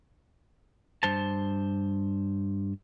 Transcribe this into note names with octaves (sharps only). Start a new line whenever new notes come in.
G2 C5 A5